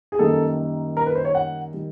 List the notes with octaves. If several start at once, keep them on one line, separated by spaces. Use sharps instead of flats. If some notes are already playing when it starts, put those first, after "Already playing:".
G#4
F#2 D#3 G3 A#3 A4
A#4
B4
C5
C#5
F#5
D#3 G3